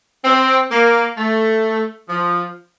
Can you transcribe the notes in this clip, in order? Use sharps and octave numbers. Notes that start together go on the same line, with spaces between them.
C4
A#3
A3
F3